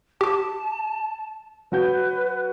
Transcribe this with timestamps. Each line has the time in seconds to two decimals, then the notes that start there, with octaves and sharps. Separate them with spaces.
0.21 G4 A5 D6
1.72 F#3 F#4 B4 G6